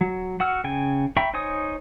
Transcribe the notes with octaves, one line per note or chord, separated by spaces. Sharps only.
F#3
F#4 F#5 E6 F6
C#3 G5 G#5
E5 G5 A#5 B5 C#6
D#4 C5 C#5 G#5 D#6